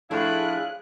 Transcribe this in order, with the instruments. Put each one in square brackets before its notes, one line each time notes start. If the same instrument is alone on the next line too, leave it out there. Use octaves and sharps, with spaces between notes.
[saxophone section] A2 E4 [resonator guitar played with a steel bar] F3 A3 D4 [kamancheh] G#4 F#6 [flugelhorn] F5